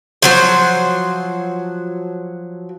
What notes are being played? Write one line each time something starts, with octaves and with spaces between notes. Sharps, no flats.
F3 F#3 C5